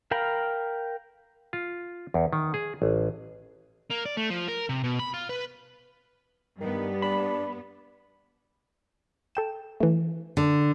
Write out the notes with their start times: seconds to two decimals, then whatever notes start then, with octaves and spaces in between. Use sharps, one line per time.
0.11 A#4 F5 G5 A#5 B5
1.53 F4
2.14 E2
2.33 D#3
2.54 G#4
2.82 A1
3.90 A#3
4.05 D5
4.17 A3
4.30 F3
4.48 A#4
4.69 C3
4.84 B2
4.99 B5
5.14 F4
5.29 B4
6.60 G2 D#3 G3 B3
7.02 D4 B5
9.35 A4 G5 E7
9.80 E3 A3
10.37 D3